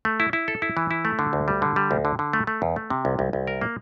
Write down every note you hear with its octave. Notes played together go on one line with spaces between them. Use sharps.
A3
E4
E4
A4
E4
E3
E4
A3
D3
D2
G3
D3
G3
D2
D3
D3
A3
A3
E2
A3
C3
C2
C2
C2
A#4
A#3